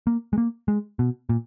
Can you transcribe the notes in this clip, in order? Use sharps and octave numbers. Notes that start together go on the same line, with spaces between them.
A#3
G#3
A#3
G#3
B2
A#2